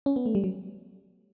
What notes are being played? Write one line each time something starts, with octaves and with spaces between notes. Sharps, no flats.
C#4
B3
A3
G3
F#3